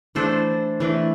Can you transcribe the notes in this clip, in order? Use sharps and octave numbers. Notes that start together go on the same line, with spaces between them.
E3 A3 D4 A4 C5
E3 A3 D4